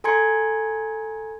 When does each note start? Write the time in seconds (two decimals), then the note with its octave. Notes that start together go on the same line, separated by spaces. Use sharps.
0.04 A4 G#5 A#5 C6 G#6 C#7